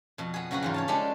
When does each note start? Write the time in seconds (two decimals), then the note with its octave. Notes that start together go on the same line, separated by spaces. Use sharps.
0.18 F2 B2
0.34 B3 G#4
0.51 C#3 F#3 C4 F#4 B4
0.63 E2 G#2 F4
0.74 C#5 F5 A5
0.88 G#3 C#4 D4 G4 A4